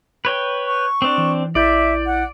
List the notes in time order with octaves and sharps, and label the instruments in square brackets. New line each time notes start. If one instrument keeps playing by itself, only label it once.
[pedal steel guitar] B4 C#5 G5
[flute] C#6
[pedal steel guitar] C4 D4
[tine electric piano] E3
[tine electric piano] A#1 E4 G6 [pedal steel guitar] D5 [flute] E5
[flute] F#5